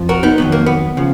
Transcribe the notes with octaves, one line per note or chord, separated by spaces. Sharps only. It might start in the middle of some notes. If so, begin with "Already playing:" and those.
Already playing: F2 F3
F#4 A#4
B3 D#4
F2 D#3 F#3 B3
A#3
B3
C#3 F3